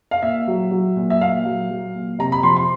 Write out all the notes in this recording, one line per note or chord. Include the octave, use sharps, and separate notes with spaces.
F5
A#2 E5
F#3
F#3
A#2
E5
A#2 F5
F#3
F#3
A#2
C3 A#5
B5
F3 C6
C6